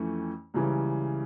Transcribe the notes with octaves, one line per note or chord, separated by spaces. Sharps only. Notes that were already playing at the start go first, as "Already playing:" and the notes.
Already playing: F2 E3 A3 C#4
C#2 C#3 E3 G3